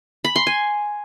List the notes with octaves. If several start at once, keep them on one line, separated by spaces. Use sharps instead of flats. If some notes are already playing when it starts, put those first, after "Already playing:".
B5
C6
G#5